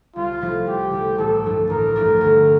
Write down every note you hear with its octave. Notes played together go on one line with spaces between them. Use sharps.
C2 F4
C3 F3 A3 E4
C2 G4
C3 F3 A3 E4
A1 A4
G2 F3 A3 D4
A1 A#4
G2 F3 A3 D4
D2